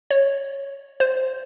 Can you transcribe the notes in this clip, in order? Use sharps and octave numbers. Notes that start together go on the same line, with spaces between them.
C#5
C5